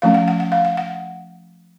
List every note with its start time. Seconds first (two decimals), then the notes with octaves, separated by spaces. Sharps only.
0.02 F3 A3 C#4 F5
0.14 F#5
0.28 F#5
0.40 F#5
0.52 F5
0.65 F#5
0.77 F#5